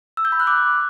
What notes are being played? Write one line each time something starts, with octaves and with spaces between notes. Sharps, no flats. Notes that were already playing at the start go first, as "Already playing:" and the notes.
E6
G6
B5
F#6
D6